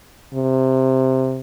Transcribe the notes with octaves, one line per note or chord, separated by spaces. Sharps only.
C3